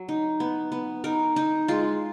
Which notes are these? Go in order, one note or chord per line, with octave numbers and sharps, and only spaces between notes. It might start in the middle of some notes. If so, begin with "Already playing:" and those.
Already playing: F#3
D#4
B3
B3
D#4 A#4
D#4
G#3 F4